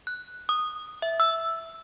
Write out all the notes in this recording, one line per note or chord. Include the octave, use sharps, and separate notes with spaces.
F#6
D#6
E5
E6